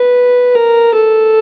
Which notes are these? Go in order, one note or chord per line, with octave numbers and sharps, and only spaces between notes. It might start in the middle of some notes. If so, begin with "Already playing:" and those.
Already playing: B4
A#4
A4